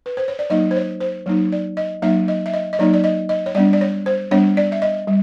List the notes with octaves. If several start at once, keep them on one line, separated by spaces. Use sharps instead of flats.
B4
C5
C#5
D5
F#3 A#3 D#4 D#5
C5
C#5
C5
F#3 A#3 D#4
D5
D#5
F#3 A#3 D#4 E5
D#5
E5
D#5
D#5
F#3 A#3 D#4 D5
D5
D#5
D#5
C#5
G3 B3 D4 D5
D5
C#5
C5
G3 B3 D4 C#5
D5
E5
D#5
G3